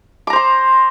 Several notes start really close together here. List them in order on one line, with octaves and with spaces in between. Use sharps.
D6 A#5 C5 C6